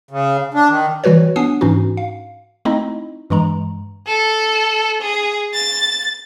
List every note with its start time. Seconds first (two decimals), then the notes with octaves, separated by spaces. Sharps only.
0.11 C#3
0.54 D4
0.69 D#3
1.04 E3 G3 F#4 B4 C#5
1.36 B3 D4 G#5 D#6 C7
1.61 G#2 E3 C#4 D#4 F#4
1.97 F5
2.65 A3 C4 D#4 E4 D#5
3.30 G2 E3 G#3 A#5
4.07 A4
5.02 G#4
5.54 A6